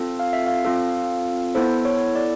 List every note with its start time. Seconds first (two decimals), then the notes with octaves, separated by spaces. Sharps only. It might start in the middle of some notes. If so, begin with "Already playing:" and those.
Already playing: C4 F4 A4
0.19 F5
0.33 E5
0.47 F5
0.65 C4 F4 A4
1.55 B3 E4 A4 C5
1.85 C#5
2.16 D5